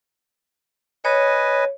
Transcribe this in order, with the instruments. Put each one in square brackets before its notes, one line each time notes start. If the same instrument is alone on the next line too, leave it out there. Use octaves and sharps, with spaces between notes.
[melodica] B4 D#5 G#5 [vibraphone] C#5